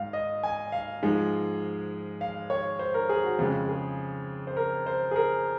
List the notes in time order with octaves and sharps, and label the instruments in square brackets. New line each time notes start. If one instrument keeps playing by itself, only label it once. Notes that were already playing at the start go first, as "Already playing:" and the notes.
Already playing: [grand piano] G#2 F5
D#5
G#5
F5
G#2 F3 G#3
F5
C#5
C5
A#4
G#4
F#4
F2 C#3 G#3 F4
G#4
C5
A#4
C5
G#4
A#4